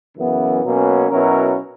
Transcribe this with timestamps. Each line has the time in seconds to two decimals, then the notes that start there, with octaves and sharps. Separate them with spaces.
0.16 F#2 C#3 E3 B3
0.64 B2 F#3 A#3 C#4
1.10 B2 F#3 C#4 E4 A#4